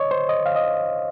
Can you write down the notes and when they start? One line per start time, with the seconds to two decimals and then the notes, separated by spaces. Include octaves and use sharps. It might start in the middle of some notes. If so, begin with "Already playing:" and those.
Already playing: C#5 D#5
0.11 C5
0.29 D#5
0.46 F5
0.56 D#5